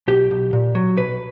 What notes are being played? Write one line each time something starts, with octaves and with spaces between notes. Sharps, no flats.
B1 G4
B1
A#2
F#3
B1 B4